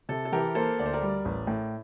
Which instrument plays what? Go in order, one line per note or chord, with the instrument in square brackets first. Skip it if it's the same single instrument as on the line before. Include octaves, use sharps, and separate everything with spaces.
[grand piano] C3 [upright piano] A4
[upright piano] A4
[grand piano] E3 [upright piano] G4 A#4
[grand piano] A#3 [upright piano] A4 C5
[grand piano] D2 [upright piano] D5
[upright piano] C5
A#4 D5
[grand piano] G3
A1
A2